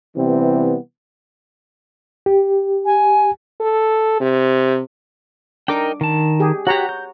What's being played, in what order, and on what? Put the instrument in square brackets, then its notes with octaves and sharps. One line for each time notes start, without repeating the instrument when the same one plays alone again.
[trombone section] C3 E3 G3 B3 C4
[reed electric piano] G4
[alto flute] G#5
[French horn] A4
C3
[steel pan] D4 D6 [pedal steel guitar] D#4 A#4 G5
[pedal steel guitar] D#3 A5
[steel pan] G4 G#4
[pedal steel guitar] F#4 G4 [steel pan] C#5 F#5 A#5
[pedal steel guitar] G6